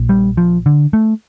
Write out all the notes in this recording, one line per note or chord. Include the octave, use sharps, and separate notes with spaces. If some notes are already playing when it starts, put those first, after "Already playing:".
Already playing: A#1 A#2
G3
F3
D3
A3